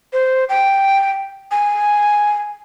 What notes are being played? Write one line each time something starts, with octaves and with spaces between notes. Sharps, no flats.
C5
G5
G#5